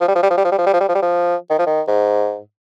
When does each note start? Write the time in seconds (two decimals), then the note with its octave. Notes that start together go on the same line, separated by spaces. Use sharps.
0.01 F3
0.08 G3
0.16 F3
0.23 G3
0.31 F3
0.37 G3
0.44 F3
0.52 G3
0.59 F3
0.66 G3
0.73 F3
0.81 G3
0.89 F3
0.95 G3
1.02 F3
1.50 D#3
1.59 F3
1.67 D#3
1.88 G#2